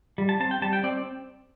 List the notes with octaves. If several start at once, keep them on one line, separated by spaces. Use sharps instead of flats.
G3
A5
C4 A5
G5
G3 A5
G5
C4 D5